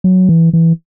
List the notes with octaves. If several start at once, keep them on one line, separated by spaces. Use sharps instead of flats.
F#3
E3
E3